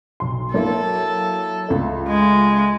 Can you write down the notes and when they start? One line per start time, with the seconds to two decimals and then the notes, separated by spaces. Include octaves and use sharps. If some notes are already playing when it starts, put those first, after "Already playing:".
0.20 B1 C6
0.54 F#3 A#3 E4 A4
1.68 C#2 A3
2.08 G#3